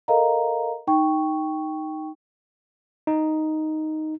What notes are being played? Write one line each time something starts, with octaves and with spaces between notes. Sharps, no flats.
A4 A#4 D#5 F5 A#5
D#4 G5 C#6
D#4